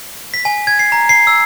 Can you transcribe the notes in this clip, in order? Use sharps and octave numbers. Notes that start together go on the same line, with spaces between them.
B6
G#5
G#6
C7
A#5
C7
E6